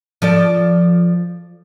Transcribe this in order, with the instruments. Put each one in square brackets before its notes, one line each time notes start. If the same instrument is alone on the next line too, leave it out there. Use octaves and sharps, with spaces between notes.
[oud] F3 A4 D5